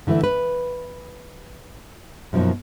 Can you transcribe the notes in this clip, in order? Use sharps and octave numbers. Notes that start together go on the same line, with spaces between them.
D3 E3 A3 E4
B4
F#2 B2 F3 A#3 D#4